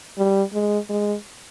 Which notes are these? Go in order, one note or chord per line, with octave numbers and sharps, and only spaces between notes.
G3
G#3
G#3